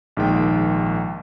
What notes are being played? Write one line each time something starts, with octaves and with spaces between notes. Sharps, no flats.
A#1 G#2 D#3 G5